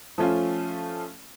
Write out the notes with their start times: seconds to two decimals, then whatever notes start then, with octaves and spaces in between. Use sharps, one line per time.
0.18 F3 A3 C#4 F4